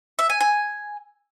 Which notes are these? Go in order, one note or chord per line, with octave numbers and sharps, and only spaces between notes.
E5
G#5
G#5